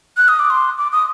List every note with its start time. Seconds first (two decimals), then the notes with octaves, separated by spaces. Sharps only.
0.17 F#6
0.28 D#6
0.39 D6
0.50 C6
0.78 D6
0.92 D#6